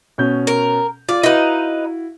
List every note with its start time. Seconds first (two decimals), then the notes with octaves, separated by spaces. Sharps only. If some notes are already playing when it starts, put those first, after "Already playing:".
0.18 B2 C#4 G6
0.47 A#4
1.09 F4 D5
1.23 D#4 E4 F#4 B4 F5